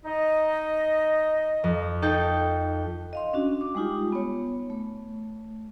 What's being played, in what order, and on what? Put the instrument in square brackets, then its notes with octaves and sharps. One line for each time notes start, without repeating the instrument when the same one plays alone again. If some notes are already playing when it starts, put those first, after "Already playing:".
[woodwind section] D#4 D#5
[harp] F2
D#4 A4 G5
[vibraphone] D#5 F5 C6
C#4 D4 F#4
D6
G3 G#3 D#4 F4 G4
B3 C#5
A3